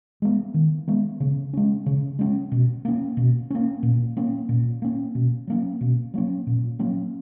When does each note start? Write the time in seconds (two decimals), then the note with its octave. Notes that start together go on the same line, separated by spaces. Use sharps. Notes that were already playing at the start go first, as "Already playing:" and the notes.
0.22 G#3 B3
0.54 D#3
0.88 G#3 B3
1.20 C#3
1.53 G#3 C#4
1.86 C#3
2.19 G#3 C#4
2.52 B2
2.85 A#3 C#4
3.17 B2
3.50 A#3 C#4
3.83 A#2
4.17 A#3 C#4
4.49 A#2
4.82 A#3 C#4
5.15 B2
5.47 F#3 A#3 C#4
5.81 B2
6.14 F#3 A#3 C#4
6.47 A#2
6.79 F#3 A#3 C#4